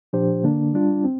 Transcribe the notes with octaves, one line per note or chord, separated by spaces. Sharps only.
A#2 F3 D4 G4 C5
D3 A#3 D4
G3 D4 F4
C4